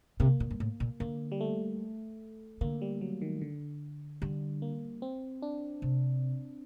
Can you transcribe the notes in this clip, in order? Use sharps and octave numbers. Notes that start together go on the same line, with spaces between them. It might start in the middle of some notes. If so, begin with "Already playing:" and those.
C3 A#3
A#2
G2
A2
A#2
D3 A#3
G3
A3
D3 A#3
G3
F#3
D#3
D3
D3 G3
A#3
C4
D4
C3